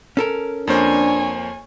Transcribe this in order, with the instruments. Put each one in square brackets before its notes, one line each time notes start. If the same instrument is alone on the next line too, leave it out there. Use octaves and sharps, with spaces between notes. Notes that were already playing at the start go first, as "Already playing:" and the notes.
[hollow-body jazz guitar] C#4 A4 A#4
[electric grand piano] F2 A#3 C5 [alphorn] D4 [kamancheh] C#5 G#5